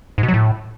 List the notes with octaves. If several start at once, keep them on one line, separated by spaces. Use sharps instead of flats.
G#2
B2
F#3
A2